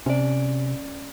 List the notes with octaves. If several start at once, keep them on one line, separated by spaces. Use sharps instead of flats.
C3 C#4 D5